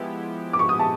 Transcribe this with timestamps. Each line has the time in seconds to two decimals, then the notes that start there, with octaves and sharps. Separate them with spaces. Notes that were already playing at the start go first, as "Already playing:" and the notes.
Already playing: F3 G#3 B3 E4 G4
0.53 D6
0.59 C#6
0.69 D#6
0.79 A5